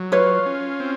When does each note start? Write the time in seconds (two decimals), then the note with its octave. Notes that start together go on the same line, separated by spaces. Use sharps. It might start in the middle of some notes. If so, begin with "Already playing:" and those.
Already playing: F#3
0.12 F4 B4 C#5
0.46 C#4
0.80 C4